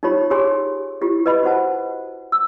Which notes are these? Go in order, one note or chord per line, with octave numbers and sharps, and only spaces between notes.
D#4 F4 G4 C#5 B5
G4 G#4 C#5 G#5 C6
E4 F4 G4
B4 D#5 B5
F#4 C5 F#5 A5
E6